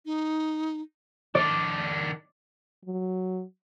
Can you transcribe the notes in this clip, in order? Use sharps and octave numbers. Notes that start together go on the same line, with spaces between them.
D#4
D#3 D4 D5
F#3